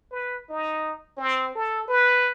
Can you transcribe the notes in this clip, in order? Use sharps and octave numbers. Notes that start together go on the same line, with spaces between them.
B4
D#4
C4
A4
B4